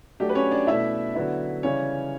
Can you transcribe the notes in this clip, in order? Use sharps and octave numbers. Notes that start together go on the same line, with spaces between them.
F#3 A3 D4 G4
B4
C#4 C#5
D4 D5
B2 A3 D4 E4 E5
D3 F#3 B3 E4
C#3 E3 G3 C#4 C#5